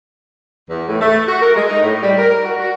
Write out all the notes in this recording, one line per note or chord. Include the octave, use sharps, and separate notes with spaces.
E2
A2
A3
F#4
A#4
G#3
D#4
A2
G3
A#4
F#4
F#4